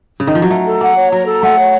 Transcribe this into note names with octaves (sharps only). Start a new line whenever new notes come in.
C#3
D#3
F3
F#3
A3 A#5
A4
A#3 F#5
C#5
F#3 A#5
A4
A3 F#5
C#5